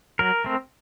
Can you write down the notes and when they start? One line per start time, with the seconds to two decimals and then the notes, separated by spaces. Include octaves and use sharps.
0.19 F#3 A#4
0.44 A3 C4